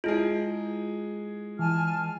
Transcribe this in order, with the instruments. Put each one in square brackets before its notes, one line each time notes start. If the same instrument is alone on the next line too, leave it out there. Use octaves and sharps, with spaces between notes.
[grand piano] G#3 G#4 [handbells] E4 F4
[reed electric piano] E3 [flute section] G#5 A5 F6